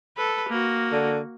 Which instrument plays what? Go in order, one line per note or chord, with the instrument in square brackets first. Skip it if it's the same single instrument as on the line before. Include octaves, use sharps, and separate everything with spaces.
[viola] A4 B4
A#3 F#4
[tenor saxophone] D3